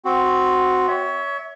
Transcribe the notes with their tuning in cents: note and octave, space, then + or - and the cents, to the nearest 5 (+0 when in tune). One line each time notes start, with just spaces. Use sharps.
C4 +0 F#4 +0
C#5 +20 E5 -15